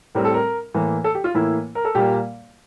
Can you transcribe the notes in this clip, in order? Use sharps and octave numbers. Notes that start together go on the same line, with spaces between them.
A2 G3 C4 A#4
A4
A#4
A2 E3 A#3
A4
G4
F4
A2 E3 A#3 E4
A#4
A4
A#2 G3 A#3 G4